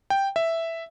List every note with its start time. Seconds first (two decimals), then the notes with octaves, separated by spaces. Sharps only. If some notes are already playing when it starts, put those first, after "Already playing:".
0.10 G5
0.36 E5